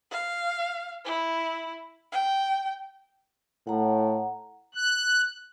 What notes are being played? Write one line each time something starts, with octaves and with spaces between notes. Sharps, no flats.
F5
E4
G5
A2 F#5 A#5
F#6